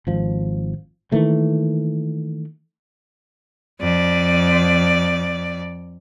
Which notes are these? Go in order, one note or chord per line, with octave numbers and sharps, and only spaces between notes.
G#1 F3
D#3 E3 A3 A#3
F2 D5